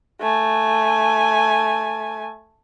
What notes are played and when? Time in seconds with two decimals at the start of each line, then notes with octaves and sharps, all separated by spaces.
0.20 A3 G#5